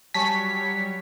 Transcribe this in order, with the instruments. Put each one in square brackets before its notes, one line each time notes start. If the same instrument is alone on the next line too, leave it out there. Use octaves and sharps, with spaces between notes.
[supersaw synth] F#3 G3 C#5 [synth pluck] G#5 A5 C#6 [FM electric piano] B6